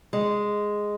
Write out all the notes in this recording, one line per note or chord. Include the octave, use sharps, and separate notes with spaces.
G#3